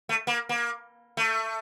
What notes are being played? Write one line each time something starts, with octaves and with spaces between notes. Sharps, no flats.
A3
A#3
A#3
A3